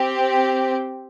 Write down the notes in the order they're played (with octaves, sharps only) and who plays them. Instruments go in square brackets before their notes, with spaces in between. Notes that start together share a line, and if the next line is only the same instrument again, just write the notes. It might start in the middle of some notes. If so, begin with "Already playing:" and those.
Already playing: [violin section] C4 G4